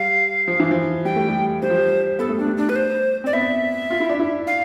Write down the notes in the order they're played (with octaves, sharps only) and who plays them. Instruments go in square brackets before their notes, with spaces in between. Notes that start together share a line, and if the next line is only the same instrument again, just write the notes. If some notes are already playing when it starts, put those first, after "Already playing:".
Already playing: [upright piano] G3 [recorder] F5
[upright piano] F3
E3
F3
[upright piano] G3 [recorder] G5
[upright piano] A3
G3
[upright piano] G3 [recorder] C5
[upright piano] F3
G3
[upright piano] B3 [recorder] A4
[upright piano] A3
[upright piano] G3 [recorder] D4
[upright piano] A3
[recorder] D4
B4
C5
[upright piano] C4 [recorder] D5
[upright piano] B3 [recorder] E5
[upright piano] F4
E4
D4
E4
[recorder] F5